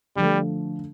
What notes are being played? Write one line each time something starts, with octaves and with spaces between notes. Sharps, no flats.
D3 F3 G3 A3